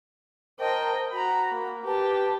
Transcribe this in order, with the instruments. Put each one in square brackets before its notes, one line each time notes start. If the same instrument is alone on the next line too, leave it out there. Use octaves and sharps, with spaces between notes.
[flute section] A#4 C5 A5 [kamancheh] D#5 G5
[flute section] F#4 [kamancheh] A#5 B5
[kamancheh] A#3
[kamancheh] G4 [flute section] B4 A5